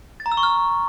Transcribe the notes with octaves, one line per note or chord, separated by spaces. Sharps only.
A6
A#5
E6
C#6
F6